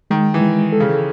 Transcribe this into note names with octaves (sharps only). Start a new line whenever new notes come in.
D#3 G#3
E3
G#3
A4
C#3